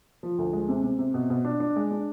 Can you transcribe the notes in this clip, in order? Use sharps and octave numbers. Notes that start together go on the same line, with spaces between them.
F3
D2
G#3
C3
C3
C3
B2
B2
D4
D4
G#3
D4